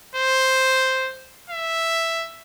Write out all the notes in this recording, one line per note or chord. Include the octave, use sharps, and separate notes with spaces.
C5
E5